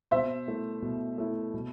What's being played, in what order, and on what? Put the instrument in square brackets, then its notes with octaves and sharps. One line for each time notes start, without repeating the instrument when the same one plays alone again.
[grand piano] B2 [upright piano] C5 E5
[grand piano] A3 E4
B2
A3 E4
B2